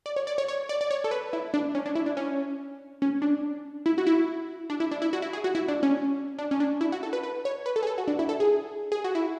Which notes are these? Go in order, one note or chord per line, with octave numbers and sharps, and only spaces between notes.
D5
C#5
D5
C#5
C#5
D5
D5
C#5
A4
B4
E4
D4
C#4
D4
E4
D4
C#4
C#4
D4
E4
F#4
E4
D4
E4
D4
E4
F#4
E4
G#4
F#4
E4
D4
C#4
D4
C#4
D4
E4
F#4
A4
B4
B4
C#5
B4
A4
G#4
A4
F#4
D4
E4
A4
G#4
G#4
F#4
E4